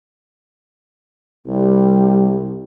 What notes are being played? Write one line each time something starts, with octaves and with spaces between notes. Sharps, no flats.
C2 G3